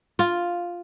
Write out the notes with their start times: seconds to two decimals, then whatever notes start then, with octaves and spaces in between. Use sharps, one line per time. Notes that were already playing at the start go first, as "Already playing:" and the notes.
0.19 F4